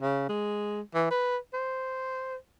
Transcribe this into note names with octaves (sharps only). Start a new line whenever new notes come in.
C#3
G#3
E3
B4
C5